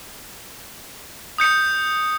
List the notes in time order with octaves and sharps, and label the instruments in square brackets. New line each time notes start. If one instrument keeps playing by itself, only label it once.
[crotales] D#6 G6 C#7